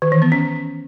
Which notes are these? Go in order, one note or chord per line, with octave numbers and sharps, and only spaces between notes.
D#3
E3
B3
C#4